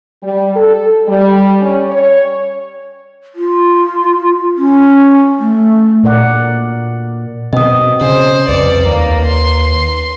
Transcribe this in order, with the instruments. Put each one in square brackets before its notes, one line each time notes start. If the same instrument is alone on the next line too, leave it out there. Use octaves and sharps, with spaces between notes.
[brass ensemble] G3
A4
G3
C#4
C#5
[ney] F4
C#4
A3
[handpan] A#2 A#4 D5 F#5
[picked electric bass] B2 C4 [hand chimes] D#5 D#6
[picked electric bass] C#3 [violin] C5
[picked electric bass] C2 F2 [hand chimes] B4 [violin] D5
[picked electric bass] D#2 [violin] A#3
[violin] C6